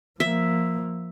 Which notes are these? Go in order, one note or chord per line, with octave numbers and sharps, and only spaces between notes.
F3 A#3 E5